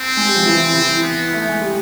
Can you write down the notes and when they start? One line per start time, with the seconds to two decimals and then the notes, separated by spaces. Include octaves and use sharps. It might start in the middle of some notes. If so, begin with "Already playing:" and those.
Already playing: C4
0.17 G#3
0.26 G3
0.36 F3
0.46 E3
0.74 E3
1.03 B3
1.34 A3
1.48 G#3
1.62 G3